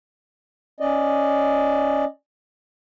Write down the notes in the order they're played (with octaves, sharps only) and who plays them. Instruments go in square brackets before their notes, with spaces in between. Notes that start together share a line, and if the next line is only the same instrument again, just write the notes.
[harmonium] C#4 D5 D#5